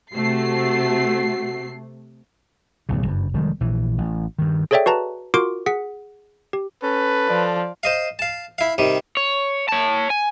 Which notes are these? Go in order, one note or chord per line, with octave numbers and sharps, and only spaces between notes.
C3 A3 F#4 C7
D1 B1 C#3
F#1 G2
F1 D#3 G3 G#3
A#1 E3
A1
G2 D#3
G#4 A4 C#5 D5 E5 G5
F#4 B4 A5 A#5
F4 F#4 A#4 C6 D6 D7
G#4 F#5 B6
G4
C#4 A4 B4
F3 D5
C5 D#5 F5
F5 A5
E4 F5
C3 D#3 G3
C#5
C#5 A5
G#5